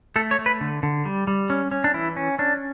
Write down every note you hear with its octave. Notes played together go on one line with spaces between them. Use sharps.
A3 A4
C#5
A3
B4
D3
D3
G3
G3
C#4
C#4
D4
E3 E4
C#4
C#4 D4